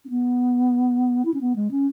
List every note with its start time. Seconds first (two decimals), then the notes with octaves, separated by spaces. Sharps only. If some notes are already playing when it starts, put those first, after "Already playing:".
0.05 C#4
0.10 B3
1.25 E4
1.34 C#4
1.41 B3
1.56 G#3
1.71 C#4